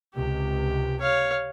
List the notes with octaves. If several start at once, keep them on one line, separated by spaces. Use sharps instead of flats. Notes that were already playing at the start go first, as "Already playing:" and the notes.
C#2 C3 G4
C#5 F5